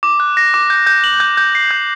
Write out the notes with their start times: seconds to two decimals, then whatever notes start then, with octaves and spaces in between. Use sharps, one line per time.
0.03 D6
0.20 F#6
0.37 A#6
0.54 D6
0.70 G6
0.87 G6
1.04 F#7
1.20 G6
1.37 G6
1.55 C7
1.71 G6